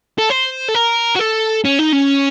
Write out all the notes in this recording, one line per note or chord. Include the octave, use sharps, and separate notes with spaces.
A4
C5
A4
A#4
F#4
A4
C#4
D#4
C#4